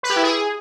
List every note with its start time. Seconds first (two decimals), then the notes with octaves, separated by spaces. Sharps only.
0.03 B4
0.10 G4
0.16 E4
0.23 G#4